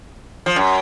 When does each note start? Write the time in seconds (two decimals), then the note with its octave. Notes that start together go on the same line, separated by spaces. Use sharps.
0.46 F3
0.56 F#2